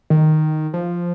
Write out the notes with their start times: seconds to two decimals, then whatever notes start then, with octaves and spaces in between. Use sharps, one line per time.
0.10 D#3
0.74 F3